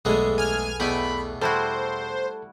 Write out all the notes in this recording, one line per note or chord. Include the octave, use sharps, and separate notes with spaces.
B1 E2 G#3 A3 B3 G#4 A4
G#5 F6
E2 B2 A3 B3 G5 G#5 B5
G3 E4 F#4 A4 C5 A5